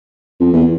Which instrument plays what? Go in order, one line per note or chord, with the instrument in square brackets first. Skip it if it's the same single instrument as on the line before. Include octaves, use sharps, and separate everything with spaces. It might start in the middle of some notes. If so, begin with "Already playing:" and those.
[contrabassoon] F2
E2